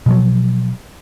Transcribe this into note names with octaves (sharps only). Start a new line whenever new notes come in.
B2 F3 F#3